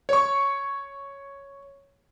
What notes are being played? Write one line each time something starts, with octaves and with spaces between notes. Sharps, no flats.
C#5 C#6